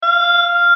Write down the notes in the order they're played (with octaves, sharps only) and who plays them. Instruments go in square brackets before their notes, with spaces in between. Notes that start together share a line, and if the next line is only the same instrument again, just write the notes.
[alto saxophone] F5